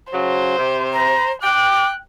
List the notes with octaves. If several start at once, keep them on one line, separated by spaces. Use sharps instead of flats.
C#3 F#3 C5
C3
A#5
G5 D6 F#6